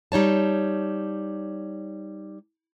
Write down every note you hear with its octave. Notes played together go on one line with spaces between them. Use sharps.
G3 D#4 C#5 A5